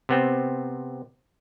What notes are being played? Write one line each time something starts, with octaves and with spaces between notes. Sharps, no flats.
C3 B3 C4